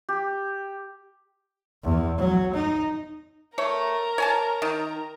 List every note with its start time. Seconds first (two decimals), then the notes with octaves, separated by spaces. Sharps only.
0.09 G4
1.84 E2
2.18 F#3
2.54 D#4
3.58 A3 A#4 C#5 A#5
4.18 C#5 G#5 A5
4.62 D#3